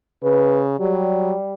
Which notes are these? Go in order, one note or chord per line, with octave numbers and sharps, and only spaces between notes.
C#3 B4
F#3 G3